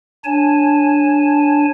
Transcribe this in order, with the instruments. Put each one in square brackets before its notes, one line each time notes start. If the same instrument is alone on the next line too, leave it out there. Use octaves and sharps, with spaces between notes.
[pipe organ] D4 C#5 G#5 A5